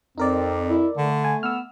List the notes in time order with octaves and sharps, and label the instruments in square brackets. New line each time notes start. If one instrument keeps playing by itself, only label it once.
[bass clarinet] F2 [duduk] C4 [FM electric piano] D#4 A#4 D5
[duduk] E4
[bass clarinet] D3 [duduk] A3
[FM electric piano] G#5
[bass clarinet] B3 [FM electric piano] E6 F6